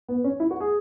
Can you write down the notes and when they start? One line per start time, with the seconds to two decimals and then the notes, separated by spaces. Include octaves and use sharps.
0.08 B3
0.24 C#4
0.40 E4
0.51 F#4
0.60 G#4